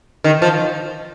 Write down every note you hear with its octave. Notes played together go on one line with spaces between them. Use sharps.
D#3
F3